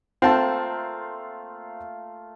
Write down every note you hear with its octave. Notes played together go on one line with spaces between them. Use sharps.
A3 A#3 C4 F4 A5